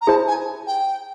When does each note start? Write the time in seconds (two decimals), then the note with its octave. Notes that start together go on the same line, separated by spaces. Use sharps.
0.01 A#5
0.07 E4 G#4 C5 A5
0.27 G#5
0.67 G5